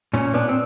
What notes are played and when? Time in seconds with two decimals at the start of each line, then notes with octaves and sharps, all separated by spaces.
0.13 A#2 C#4
0.34 B3 D4
0.49 C4